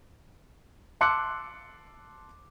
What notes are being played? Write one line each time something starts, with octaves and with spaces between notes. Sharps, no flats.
A5 C6 D6 E6 F#6 C#7